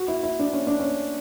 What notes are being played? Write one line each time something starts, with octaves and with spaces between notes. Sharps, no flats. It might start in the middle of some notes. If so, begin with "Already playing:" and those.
Already playing: F#4
E4
E4
D4
C#4
D4
C#4